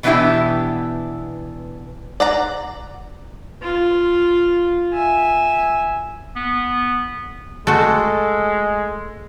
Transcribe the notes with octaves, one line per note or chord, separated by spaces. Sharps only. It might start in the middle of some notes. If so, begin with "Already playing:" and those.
B2 E3 B3 D4 E4 G4
D5 F#5 A#5
F4
E5 G#5
B3
G#3 A3 F#4 A4